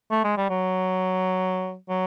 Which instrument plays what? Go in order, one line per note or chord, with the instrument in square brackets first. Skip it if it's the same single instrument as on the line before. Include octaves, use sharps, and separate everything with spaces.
[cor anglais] A3
G#3
G3
F#3
F#3